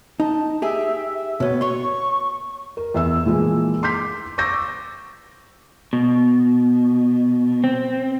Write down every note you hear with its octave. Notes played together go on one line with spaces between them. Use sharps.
D#4 A5
G4 G#4 E5
E5
B2 B3 C#5
C#5 C6 C#6
A#4
E2 E5 E6
A#2 E3 F3 G#3 E4
C6 D6 G6 B6
C#6 D6 E6 G6 A#6
B2
C4